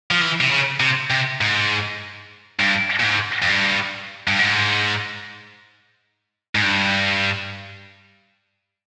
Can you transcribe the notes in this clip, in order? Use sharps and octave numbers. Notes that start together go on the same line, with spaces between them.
F3
E3
C3
C#3
C3
C3
G#2
G2
A#2
G#2
F2
G2
G2
G#2
G#2
G2